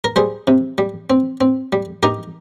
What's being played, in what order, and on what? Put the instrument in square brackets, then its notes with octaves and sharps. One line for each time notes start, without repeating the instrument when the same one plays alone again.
[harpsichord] A#4
G3 G#4 C5
C3
G3
C4
C4
G3
D#4 G4 A#4